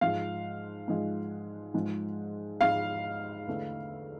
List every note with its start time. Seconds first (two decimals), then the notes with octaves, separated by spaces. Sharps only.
0.01 G#2 F3 G#3 F5
0.88 G#2 F3 G#3
1.74 G#2 F3 G#3
2.61 G#2 F3 G#3 F5
3.47 E2 D3 A3